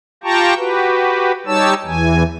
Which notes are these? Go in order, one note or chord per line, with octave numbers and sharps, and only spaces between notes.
F4 G4 G5 A5 A#5 C#6
F#4 G4 B4
G3 D#4 G4 C#5 A5 E6
E2 E3 G#5